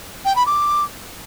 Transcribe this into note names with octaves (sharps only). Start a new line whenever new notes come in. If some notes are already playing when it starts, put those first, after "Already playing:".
G5
B5
D6